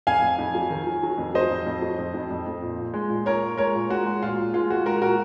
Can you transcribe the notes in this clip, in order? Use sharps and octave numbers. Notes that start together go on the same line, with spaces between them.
F2 F5 G#5
F2
F2
F#3
D#3
F#3
F#3
F2
F#3 C5 D#5
F2
F2
F#3
F2
F2
F2
F2
A#2
A#2
G#3
A#2
A#2 A#4 C#5
A#2
G#3 A#4 C#5
A#2
G#3 F#4
G#3
A#2 F4
A#2
G#3 F4
G#3 F#4
G#3 F#4 A#4
A#2 F#4 A#4